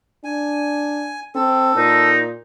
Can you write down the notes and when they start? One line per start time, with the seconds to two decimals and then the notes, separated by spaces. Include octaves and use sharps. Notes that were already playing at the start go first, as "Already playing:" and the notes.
0.24 D4 G#5
1.35 C4 A4
1.75 A#2 D#4